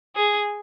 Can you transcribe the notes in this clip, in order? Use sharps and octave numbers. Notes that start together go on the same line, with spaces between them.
G#4